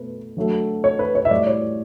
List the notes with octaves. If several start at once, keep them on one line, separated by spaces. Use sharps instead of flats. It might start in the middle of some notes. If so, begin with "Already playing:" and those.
Already playing: B2 A3 B4
D3 F#3 A3
C#5
B4
C#5
E5
A2 G3 D5
C#5